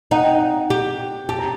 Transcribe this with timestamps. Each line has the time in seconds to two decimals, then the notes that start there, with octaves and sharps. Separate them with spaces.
0.11 D#4 F#5
0.24 G5
0.35 F#5
0.70 G4
1.29 G4 A5
1.39 A#5